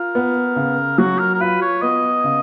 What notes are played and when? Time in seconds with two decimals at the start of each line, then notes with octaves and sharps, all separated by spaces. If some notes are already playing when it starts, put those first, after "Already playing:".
Already playing: F4 A#4
0.15 B3
0.56 C#3
0.98 F#3 F#4
1.19 A#4
1.34 A#4
1.40 F4 B4
1.61 C#5
1.82 B3 D#5
2.24 C#3